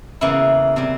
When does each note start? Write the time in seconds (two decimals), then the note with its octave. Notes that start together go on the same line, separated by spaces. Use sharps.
0.21 E2 C#3 E3 A#3 E4
0.76 C3 E3 G3 C4